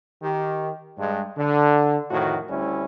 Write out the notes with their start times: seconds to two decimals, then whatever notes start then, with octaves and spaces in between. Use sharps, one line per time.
0.21 D#3 G4
0.98 G2 G#3
1.37 D3
2.10 F2 A2 D#3 F#4
2.48 D2 G3 C#4 E4